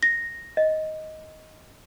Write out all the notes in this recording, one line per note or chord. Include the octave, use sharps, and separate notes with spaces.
A#6
D#5